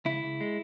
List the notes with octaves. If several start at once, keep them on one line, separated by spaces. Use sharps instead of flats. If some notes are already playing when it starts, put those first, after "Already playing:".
C#2 E4
C#2
G#3